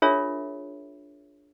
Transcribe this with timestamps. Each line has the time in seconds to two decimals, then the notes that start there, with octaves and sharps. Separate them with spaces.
0.02 D4 F4 G#4 A#4 C#5 E5